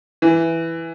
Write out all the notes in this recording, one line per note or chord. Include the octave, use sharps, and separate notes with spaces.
E3